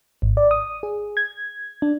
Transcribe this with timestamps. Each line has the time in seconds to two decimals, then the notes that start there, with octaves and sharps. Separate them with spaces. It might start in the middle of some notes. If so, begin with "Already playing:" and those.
0.22 G#1
0.37 D5
0.51 D#6
0.83 G#4
1.17 G#6
1.82 D4